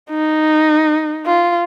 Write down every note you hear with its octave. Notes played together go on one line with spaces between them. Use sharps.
D#4
F4